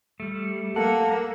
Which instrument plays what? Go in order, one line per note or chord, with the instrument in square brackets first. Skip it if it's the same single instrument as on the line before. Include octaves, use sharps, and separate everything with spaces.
[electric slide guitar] G3 A3
[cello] A#3 [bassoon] A4 [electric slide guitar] F#5